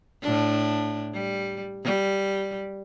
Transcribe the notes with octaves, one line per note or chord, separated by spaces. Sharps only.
A2 D4
G3
G3